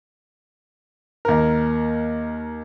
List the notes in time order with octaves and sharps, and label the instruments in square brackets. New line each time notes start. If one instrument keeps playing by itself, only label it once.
[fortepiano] D#2 A#4